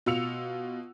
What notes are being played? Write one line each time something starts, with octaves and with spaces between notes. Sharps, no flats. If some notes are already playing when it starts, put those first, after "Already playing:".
B2 F4 E6 C#7 F7